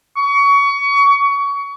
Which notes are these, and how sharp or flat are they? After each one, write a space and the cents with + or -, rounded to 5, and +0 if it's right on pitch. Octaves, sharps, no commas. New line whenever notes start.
C#6 +25